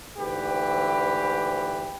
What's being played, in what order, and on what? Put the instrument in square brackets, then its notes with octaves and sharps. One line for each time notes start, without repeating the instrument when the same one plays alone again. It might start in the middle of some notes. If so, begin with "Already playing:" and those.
[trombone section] D2 G#2 E3 G4 B4